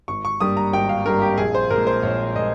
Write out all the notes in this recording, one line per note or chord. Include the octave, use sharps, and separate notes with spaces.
G#1 C#6
C#6
G2 G3 A#3 D#6
A#5
G#1 G5
F5
G2 G3 A#3 A#4
G4
A#1 G#4
C5
A#2 G#3 A#4
C5
A#1 C#5
A#2 G#3 D#5